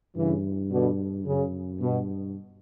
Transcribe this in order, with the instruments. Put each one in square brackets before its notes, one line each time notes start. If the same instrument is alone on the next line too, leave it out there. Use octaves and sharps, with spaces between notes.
[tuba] G2 [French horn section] C#3 E3
[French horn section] B2 D3
[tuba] F#2 [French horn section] C#3
[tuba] G2 [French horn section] B2